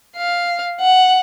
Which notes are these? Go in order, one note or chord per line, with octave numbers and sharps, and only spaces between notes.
F5
F#5